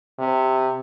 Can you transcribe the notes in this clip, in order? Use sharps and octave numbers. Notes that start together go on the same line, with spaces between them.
C3